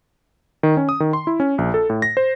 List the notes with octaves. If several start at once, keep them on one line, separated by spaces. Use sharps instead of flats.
D#3
C#4
D#6
D#3
C6
E4
C#4
A#1
A4
A2
A#6
C5